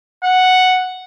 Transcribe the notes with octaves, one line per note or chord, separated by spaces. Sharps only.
F#5